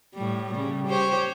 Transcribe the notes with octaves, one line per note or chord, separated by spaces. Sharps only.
A2 G3
C#3 G3
G4 C5 C#5